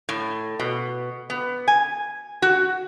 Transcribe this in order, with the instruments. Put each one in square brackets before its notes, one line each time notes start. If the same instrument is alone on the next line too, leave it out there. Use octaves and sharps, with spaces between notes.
[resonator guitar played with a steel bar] A2
B2
B3
G#5
F#4